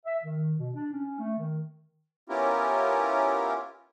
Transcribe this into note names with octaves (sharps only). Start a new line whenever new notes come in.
E5
D#3
B2
D4
C#4
A3
D#3
B3 C#4 E4 F4 G4 A#4